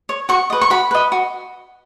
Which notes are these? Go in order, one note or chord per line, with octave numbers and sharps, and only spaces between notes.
C#5
F#4 C#6
B4 D#5
C#6
F#4 B5
B4 D#5
F#4